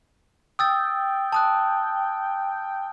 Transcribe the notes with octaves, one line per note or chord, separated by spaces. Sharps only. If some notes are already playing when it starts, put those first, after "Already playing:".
G5 D#6 E6 A6
A5 D#6 F#6